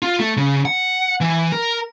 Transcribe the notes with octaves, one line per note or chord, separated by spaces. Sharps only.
F4
A3
C#3
F#5
E3
A#4